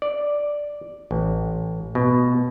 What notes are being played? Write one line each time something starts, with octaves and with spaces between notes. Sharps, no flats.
D5
A1
B2